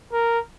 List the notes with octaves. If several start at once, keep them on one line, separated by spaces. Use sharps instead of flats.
A#4